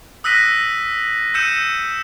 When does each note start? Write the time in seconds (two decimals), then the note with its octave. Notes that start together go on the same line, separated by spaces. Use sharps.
0.24 D#6 E6 F#6 A#6 B6 D#7
1.34 E6 G6 C#7 D#7 E7